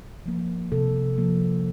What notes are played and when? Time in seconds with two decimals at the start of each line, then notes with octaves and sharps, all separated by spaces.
0.26 F3 A#3
0.72 C3 A4
1.18 F3 A#3